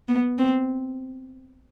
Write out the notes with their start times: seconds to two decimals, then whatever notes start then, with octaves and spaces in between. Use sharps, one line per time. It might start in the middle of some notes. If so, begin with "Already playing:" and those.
0.08 B3
0.38 C4